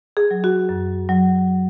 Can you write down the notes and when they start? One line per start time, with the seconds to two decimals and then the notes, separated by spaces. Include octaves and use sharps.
0.17 G#4
0.31 F#3
0.44 F#4
0.69 F#2
1.09 F#3